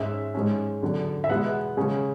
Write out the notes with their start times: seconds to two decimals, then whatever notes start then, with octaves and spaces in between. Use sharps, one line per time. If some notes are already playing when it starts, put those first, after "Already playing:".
Already playing: G#2 G#3 C#4 E5
0.34 G#2 G#3 C#4
0.82 E2 D3 F#3
1.24 E5
1.29 E2 B2 G#3 B3 F#5
1.77 C#3 G#3 C#4